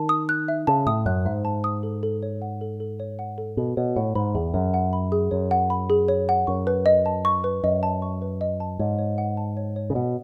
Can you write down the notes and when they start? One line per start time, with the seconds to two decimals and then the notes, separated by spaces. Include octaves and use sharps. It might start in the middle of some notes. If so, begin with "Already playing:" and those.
Already playing: D#3 A5
0.09 D#6
0.29 F#6
0.48 E5
0.67 C#3 A5
0.87 A2 D#6
1.06 F#2 F#6
1.25 G#2 E5
1.45 A5
1.64 D#6
1.83 A4
2.03 A4
2.23 C#5
2.42 F#5
2.61 A4
2.80 A4
3.00 C#5
3.19 F#5
3.38 A4
3.57 B2 A4
3.77 B2 C#5
3.96 A2 F#5
4.15 G#2 B5
4.35 E2 G#4
4.54 F#2 C#5
4.74 F#5
4.93 B5
5.12 G#4
5.31 F#2 C#5
5.51 F#5
5.70 B5
5.90 G#4
6.08 C#5
6.29 F#5
6.47 F#2 C#6
6.67 B4
6.86 D#5
7.06 A5
7.25 C#6
7.44 B4
7.64 F#2 D#5
7.83 A5
8.02 C#6
8.22 B4
8.41 D#5
8.60 A5
8.79 G#2 C#5
8.99 C#5
9.18 F#5
9.37 A5
9.57 C#5
9.76 C#5
9.90 C#3
9.95 B2 F#5